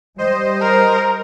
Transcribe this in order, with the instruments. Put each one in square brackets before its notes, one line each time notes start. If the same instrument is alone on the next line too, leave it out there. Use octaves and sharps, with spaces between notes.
[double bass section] G3 [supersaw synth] C5 D#5
[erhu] A#4